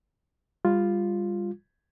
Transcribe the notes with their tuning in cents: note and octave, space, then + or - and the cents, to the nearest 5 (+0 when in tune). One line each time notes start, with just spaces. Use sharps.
G3 +30 F4 +0